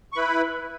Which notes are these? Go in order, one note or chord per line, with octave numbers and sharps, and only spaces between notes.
C#6
E4 B4 B5